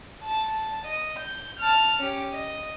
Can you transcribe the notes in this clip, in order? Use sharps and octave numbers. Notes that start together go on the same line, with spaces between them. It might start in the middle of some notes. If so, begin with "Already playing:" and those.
A5
D#5
G6
A5 F6
C#4 G4
D#5